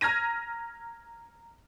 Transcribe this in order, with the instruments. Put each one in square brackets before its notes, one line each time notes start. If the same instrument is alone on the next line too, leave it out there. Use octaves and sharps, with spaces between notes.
[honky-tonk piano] A#5 F6 G#6 A#6 D#7